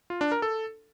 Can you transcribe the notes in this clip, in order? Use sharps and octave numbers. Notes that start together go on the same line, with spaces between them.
F4
D4
A#4
A4